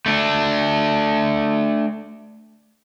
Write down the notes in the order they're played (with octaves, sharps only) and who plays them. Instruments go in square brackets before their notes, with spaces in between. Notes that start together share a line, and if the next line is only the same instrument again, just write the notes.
[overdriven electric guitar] A3 D4